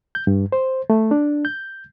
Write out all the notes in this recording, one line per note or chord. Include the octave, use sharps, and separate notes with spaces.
G6
G2
C5
A3
D4
G6